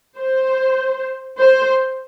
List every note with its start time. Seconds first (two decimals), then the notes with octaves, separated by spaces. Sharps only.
0.18 C5
1.38 C5